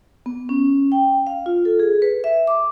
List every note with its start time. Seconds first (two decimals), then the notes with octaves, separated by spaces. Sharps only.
0.26 B3
0.49 C#4
0.92 G5
1.27 F5
1.46 F4
1.65 A4
1.79 G#4
2.02 B4
2.24 E5
2.47 D6